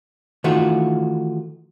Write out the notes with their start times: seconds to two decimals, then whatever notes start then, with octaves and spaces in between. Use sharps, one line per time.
0.44 D#3 E3 A3 F4 F#4